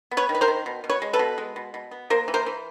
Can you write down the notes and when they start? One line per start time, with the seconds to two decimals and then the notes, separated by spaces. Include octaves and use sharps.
0.11 B3
0.17 B4 C#5
0.29 D#3
0.35 B4
0.41 A#4 C5
0.48 D#3
0.66 B2
0.84 B2
0.90 B4 C#5
1.02 G#3
1.13 A4 B4
1.19 B2
1.38 G#3
1.56 B2
1.74 B2
1.91 B3
2.10 A#3 A#4 C5
2.28 E3
2.34 A#4 C5
2.46 E3